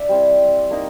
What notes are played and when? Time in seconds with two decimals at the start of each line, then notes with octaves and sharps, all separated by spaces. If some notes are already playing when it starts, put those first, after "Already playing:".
Already playing: D4 D5 E5
0.09 G3 C4 E4
0.71 A#3 D#4